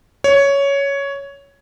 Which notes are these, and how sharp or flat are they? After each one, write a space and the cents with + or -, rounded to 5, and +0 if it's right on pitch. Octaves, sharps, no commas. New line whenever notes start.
C#5 +10